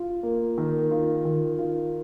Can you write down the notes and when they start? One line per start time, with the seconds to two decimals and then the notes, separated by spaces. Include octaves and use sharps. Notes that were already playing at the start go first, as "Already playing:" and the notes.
Already playing: F4
0.23 A#3
0.58 D#3
0.91 F4
1.25 D#3
1.59 F4